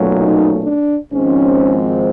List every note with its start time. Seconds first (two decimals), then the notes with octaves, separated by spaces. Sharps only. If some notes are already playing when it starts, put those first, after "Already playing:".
Already playing: B1 A#2 F#3 A3 C#4
0.18 D#4
0.64 D4
1.12 G#1 G#2 F3 G#3 C4 C#4